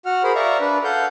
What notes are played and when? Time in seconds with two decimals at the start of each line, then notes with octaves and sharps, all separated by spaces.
0.06 F#4 F#5 F6
0.24 G#4 A#4 C5 B5
0.35 D5 E5 F5 A#5 C#6
0.61 D4 B4
0.84 A4 F5 F#5 G6